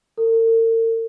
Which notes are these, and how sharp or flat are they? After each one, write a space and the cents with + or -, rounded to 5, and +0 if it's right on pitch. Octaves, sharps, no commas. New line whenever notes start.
A#4 -45